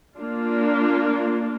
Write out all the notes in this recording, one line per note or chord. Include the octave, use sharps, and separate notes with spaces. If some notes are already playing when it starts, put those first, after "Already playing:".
A#3 D4 F4